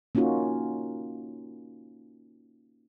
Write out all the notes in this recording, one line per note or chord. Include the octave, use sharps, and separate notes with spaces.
A#3 C#4 D#4 F4 F#4